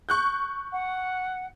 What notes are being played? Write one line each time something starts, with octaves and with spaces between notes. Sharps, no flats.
C#6 F#6 G6
F#5